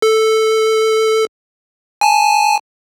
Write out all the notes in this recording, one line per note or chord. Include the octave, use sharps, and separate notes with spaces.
A4
G#5 A5